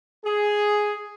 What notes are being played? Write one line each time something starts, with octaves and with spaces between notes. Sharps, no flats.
G#4